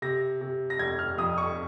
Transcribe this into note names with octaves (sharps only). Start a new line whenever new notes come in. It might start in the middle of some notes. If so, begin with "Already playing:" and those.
C3 A#6
C3
A#6
F1 G#6
F6
F2 D#6
C#6